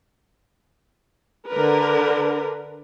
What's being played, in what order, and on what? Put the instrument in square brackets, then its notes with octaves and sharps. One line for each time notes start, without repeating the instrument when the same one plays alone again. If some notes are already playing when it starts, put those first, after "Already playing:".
[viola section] D3 A#4 B4